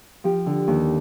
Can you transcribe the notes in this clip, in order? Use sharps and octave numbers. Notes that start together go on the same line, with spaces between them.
F3 G4
D3
D#2